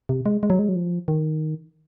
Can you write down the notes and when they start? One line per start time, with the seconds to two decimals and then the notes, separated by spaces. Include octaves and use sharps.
0.09 C3
0.26 G#3
0.43 G#3
0.50 F#3
0.59 G#3
0.69 F#3
0.76 F3
1.08 D#3